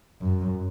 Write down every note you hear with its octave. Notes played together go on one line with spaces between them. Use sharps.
F#2